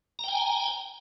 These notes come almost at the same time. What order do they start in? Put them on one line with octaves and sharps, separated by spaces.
A#5 G5 G#5